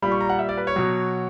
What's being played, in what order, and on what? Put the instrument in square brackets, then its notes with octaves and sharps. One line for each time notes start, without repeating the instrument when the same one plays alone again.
[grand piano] A#2 G3 B5
C#6
A#5
F#5
E5
D5
B4
C#5
B2 F#3